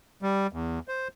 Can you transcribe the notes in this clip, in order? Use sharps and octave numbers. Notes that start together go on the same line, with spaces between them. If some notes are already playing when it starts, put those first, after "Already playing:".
G3
E2
C5